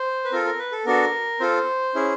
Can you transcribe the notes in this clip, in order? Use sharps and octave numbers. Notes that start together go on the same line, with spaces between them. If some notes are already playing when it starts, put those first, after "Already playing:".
Already playing: C5
B4
C4 F4 A4 A#4
A#4
B4
A4
B3 D4 F#4 A4 A#4
C4 F4 A4 C5
C#4 E4 G#4